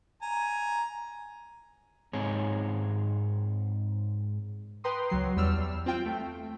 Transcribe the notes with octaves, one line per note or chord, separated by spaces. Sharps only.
G#5 A#5
G#2 G#3 C4 D#4 C#5 G#5
B4 G5 A#5 C6 D#6
C#2 F#3 C7
E2 G3 E6 F6
C4 F4 G5
A3